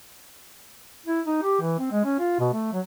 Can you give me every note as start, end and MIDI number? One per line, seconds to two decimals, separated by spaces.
1.06 1.21 64
1.26 1.39 63
1.43 1.58 67
1.61 1.77 52
1.79 1.88 60
1.91 2.03 56
2.05 2.18 61
2.19 2.38 65
2.40 2.48 47
2.53 2.70 57
2.73 2.80 54